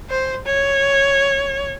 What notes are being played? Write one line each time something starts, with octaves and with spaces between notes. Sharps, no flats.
C5
C#5